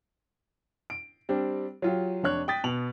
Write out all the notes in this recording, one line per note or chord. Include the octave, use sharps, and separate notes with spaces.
D7
G3 C4 D4
F#3 F4 G4
F1 D4 C#5 F#6
G5 D#6 A6 B6
B2 F7 F#7